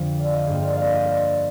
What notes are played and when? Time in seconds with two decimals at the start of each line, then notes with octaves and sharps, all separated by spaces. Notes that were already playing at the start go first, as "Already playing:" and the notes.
Already playing: F2 D3 F3 C5
0.19 D5 F5
0.33 C5 D#5
0.47 G2 F3 A#3 G#4 C5
0.62 A#4 D5
0.76 D5 F5
0.90 C5 D#5
1.04 A#4 D5